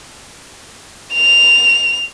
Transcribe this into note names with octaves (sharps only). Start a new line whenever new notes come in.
F7